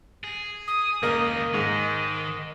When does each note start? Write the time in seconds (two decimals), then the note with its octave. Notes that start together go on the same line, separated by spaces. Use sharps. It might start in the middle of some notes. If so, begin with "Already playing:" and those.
0.24 G#4
0.67 D#6
1.03 C#2 D#3 A#3 D#5
1.54 G#2 D#3